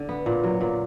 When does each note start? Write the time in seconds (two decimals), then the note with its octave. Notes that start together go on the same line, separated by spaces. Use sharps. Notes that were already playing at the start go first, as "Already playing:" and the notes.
Already playing: D3
0.09 B3
0.26 A#2
0.44 F#3
0.61 A#2